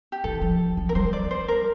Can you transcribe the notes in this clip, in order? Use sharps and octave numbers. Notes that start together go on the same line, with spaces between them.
G4
E3 A4
F3
F3
A#4
G3 C5
D5
C5
A#4